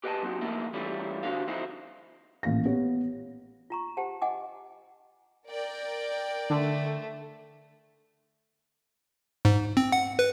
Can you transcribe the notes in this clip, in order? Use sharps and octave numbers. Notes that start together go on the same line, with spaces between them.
G4 B4 D#5 F#5 G#5 A5
F#3 C4 D#4 F#4
F3 A3 A#3 D#4 E4
E3 G3 A3 C#4 E4 F4
D3 D4 F#4 C5 F5
F3 C4 D#4 E4 C5
A1 A#2 F5 A#6
B3 G4 C#5
F4 A#5 C#6
G4 C5 F#5 A5
D#5 F#5 G#5 D6
A#4 D5 G5
D3 A3
G#2
C4
F#5
B4